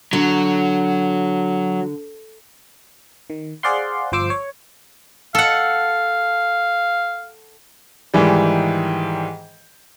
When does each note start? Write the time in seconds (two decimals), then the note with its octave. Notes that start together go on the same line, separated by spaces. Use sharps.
0.13 D3 F#3
3.30 D#3
3.63 G#4 C5 D5 F5 F#5 C6
4.12 G1 F3 C5 D6 E6 C7
4.30 C#5
5.35 A4 F5 F#5
8.14 G#2 D#3 E3 G3